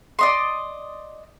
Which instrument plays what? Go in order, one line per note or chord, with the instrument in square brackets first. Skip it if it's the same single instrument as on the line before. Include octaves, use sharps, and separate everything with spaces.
[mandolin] D5 D#5 C6